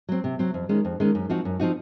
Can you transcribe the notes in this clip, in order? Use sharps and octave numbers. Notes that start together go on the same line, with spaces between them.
F#3 C4
C3
F#3 C4
F2
D#3 G#3 C#4
F2
D#3 G#3 C#4
F#2
F3 C4 D#4 F#4
F#2
F3 C4 D#4 F#4